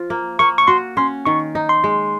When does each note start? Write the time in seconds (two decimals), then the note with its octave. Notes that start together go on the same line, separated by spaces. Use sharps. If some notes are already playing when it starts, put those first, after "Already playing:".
Already playing: F3 F4
0.10 A#3
0.39 A#3 C#6
0.58 C#6
0.67 F#4 C6
0.97 C#4 C6
1.26 D#3 C#6
1.55 D#4
1.69 C6
1.84 G#3